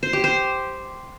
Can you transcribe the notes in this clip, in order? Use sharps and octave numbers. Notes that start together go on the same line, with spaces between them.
C5
G4
C5